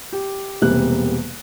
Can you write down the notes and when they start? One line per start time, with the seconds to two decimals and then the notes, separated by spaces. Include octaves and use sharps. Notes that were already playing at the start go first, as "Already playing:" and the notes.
0.12 G4
0.62 E1 C3 G3 A#3 B3 F#6